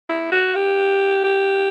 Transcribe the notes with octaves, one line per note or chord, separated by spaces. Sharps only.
E4
F#4
G4
G4